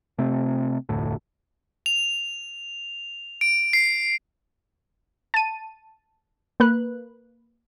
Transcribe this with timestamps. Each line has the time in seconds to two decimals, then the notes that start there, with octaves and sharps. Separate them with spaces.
0.18 C3 A3 C4
0.89 F1 D2 A2
1.86 F7
3.41 D7
3.73 C7
5.34 A5 D#7
6.60 A#3 B4 F#6